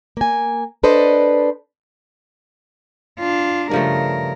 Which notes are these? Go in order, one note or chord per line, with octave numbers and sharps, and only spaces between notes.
A#3 G#5
D4 A4 B4 C5 D5 D#5
D4 F4
G2 C#3 F3 A3 A#4